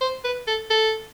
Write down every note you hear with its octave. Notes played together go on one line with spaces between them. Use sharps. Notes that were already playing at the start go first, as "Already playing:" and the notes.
C5
B4
A4
A4